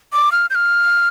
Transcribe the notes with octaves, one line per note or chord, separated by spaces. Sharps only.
D6
F6
G6
F6